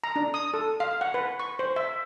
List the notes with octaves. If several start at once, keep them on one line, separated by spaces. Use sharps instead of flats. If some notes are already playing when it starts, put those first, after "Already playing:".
A#5
D4
D#6
A4
F5
F#5
B4
C#6
C5
E5